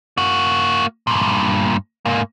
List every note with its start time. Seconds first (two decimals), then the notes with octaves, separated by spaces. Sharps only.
0.17 A#3 F#4
1.07 G2 A#2
2.05 G#2 A#3